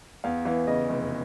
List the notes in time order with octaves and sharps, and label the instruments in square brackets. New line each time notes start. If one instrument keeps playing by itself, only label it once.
[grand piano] E2 F5
E3 F5
C#3 D#5
F1